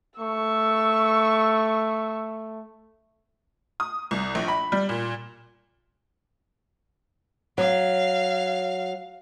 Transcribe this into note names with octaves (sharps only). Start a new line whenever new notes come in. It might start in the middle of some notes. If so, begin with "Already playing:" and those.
A3 C#6 E6
D#6
C2
A#1
B5
G3
A#2
F#3 F5